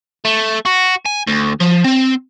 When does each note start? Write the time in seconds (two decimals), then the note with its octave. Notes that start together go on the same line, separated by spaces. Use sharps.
0.25 A3
0.66 F#4
1.05 G#5
1.27 D2
1.60 F3
1.84 C4